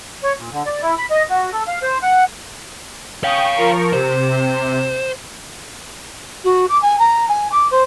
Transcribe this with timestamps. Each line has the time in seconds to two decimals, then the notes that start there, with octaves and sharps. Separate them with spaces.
0.23 C#5
0.38 A#2
0.52 D3
0.66 D5
0.82 E4
0.98 B5
1.11 D#5
1.30 F#4
1.53 A4
1.68 F5
1.82 C5
2.02 F#5
3.23 C#5 F5 G5 C#6 D#6
3.55 F3 A#4 C#6
3.93 C3 C5
6.44 F#4
6.68 D6
6.82 G#5
6.99 A#5
7.28 G#5
7.51 D6
7.70 C5